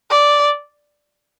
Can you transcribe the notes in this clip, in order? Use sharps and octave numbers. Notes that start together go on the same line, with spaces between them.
D5